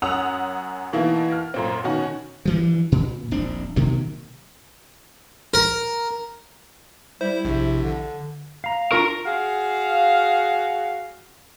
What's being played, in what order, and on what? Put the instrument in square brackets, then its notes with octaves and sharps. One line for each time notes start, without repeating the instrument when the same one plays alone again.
[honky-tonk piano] F#2 C#4 F#5 D#6 E6 F7
B2 E3 A#3 D#4 E4
F6
F#2 A#2 C4
B2 D#3 C#4 F#4
[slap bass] G2 E3 F3
A#2
D#1 A#1 C4 D4
B2 D#3 F#3 A#3
[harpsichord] A#4
[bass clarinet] G3 [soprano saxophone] E4 [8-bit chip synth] C5
[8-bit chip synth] A#1 [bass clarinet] C3
[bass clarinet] D3
[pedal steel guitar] F5 A#5
[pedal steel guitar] D4 F4 C#6 [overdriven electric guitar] A#4 A#5
[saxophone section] F#4 G#4 F5